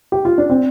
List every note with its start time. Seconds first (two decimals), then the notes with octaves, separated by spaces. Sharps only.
0.12 G4
0.25 F4
0.38 D4
0.50 C4